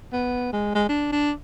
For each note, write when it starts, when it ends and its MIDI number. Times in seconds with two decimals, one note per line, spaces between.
0.13 0.51 59
0.53 0.72 56
0.75 0.86 56
0.89 1.11 62
1.12 1.31 62